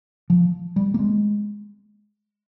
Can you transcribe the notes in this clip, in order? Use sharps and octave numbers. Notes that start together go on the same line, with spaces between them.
F3
G3
A#3
G#3